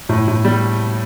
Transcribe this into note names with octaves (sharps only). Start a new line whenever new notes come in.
A2
A2
G3